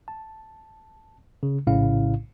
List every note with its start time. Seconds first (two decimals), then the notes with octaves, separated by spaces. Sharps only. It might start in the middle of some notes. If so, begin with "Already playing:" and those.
0.08 A5
1.43 C#3
1.67 A#1 A2 C#3 C#4 E4 F5